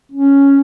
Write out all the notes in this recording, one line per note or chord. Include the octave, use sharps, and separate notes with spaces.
C#4